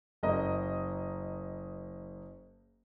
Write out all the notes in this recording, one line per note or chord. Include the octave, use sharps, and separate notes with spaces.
F#1 A#4 D#5